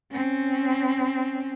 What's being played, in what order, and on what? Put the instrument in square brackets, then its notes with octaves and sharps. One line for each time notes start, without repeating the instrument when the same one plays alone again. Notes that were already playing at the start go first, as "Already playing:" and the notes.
[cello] C4 C#4